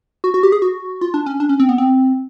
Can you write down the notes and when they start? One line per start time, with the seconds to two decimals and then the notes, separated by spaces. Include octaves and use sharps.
0.24 F#4
0.34 F#4
0.43 G4
0.52 G#4
0.62 F#4
1.01 F4
1.14 D4
1.26 C#4
1.40 D4
1.49 C#4
1.60 C4
1.69 B3
1.78 C4